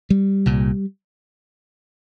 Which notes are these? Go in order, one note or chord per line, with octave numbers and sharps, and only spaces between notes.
G3
C2 A#2